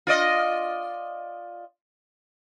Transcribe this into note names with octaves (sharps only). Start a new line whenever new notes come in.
F4 D5 D#5